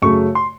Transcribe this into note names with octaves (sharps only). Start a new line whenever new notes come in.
F#2 C#3 F#3 A3 C#6
C6